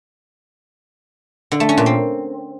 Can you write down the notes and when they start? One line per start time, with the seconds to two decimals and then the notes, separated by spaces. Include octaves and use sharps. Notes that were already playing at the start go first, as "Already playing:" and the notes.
1.52 D3
1.60 A3
1.69 C#4
1.78 A#2
1.86 C4